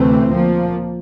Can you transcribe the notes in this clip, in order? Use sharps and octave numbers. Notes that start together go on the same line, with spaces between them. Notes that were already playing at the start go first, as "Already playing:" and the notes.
Already playing: D2 C3 E3 A3 C4
A#2 F3 A#3